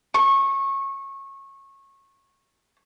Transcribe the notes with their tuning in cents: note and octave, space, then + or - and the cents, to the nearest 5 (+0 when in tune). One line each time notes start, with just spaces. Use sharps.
C#6 -20